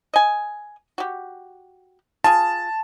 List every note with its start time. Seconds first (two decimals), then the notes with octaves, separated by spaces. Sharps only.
0.14 D#5 G#5
0.98 F#4 G4
2.24 F4 G#4 A5